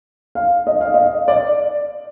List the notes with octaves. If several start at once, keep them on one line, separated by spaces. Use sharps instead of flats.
F5
D#5
F5
D#5
D5